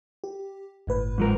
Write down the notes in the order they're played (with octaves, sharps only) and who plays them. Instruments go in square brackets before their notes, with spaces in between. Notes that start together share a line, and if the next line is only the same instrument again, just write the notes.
[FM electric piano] G4
G1 A2 B4
[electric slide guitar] G#2 F3 A#4